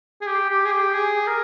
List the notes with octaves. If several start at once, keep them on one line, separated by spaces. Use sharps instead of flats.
G#4
G4
G4
G#4
G4
G#4
A#4